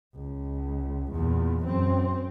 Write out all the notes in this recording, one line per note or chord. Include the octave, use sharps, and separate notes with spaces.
C#2
E2 A#2
F#2 C4